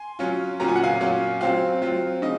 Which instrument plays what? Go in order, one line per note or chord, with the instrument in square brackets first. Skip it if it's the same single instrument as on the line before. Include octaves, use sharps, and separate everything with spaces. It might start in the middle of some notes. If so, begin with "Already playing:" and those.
Already playing: [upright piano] G#5 C6
F#3 C#4 F4
A#2 F#3 C#4 F4 A#5
G#5
F#5
F5 G#5
A#2 F#3 C#4 F4
F#3 C4 F4 F5
F#3 C4 F4
C#3 D#5